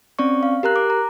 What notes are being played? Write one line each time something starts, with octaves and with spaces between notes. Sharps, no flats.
C4 C#4 D5 C#6
F5
G4 A#4 A#5 F#6
D6
A#5